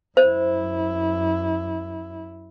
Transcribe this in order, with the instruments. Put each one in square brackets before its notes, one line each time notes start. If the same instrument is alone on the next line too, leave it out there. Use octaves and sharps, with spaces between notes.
[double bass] F#2 E4 [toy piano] C5